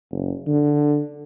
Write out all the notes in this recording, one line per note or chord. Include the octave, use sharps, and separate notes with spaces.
F#1
D3